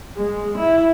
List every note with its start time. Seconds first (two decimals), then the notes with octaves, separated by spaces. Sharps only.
0.17 G#3
0.57 E4